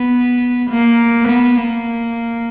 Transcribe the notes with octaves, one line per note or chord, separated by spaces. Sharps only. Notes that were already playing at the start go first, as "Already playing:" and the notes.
Already playing: B3
A#3
B3
A#3